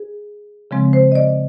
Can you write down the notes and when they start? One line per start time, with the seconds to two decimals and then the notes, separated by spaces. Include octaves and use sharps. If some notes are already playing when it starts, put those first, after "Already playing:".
Already playing: G#4
0.71 C#3 F3 G#3 C4
0.93 C5
1.12 D#5
1.15 D5